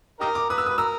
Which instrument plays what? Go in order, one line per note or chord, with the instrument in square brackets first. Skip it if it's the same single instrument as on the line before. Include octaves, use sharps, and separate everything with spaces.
[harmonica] D#4 G4 A#4 [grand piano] D#6
[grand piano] D6
[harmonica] B4 [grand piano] D#6
[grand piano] E6
[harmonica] B4 [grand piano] D#6
[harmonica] A#4 [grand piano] E6